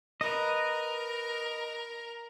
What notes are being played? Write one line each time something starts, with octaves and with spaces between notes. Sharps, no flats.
A#4 B4 D#5